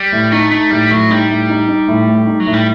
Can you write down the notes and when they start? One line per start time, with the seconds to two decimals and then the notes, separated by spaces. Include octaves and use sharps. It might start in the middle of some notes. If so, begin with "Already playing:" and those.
Already playing: G3
0.12 A2
0.32 A3 D#4
0.51 A3 D#4
0.71 A2 G3
0.90 A2 F#3
1.10 G3 D#4
1.30 A2
1.49 D#4
1.68 D#4
1.88 A2
2.07 A3
2.27 D#4
2.40 F#3
2.47 A2
2.54 G3